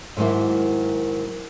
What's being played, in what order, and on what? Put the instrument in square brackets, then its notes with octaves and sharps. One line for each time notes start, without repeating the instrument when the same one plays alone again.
[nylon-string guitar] G#2 D#3 F#3 A#3 E4